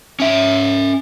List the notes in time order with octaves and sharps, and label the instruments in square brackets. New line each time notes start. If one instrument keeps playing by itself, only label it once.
[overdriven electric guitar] C#4 E5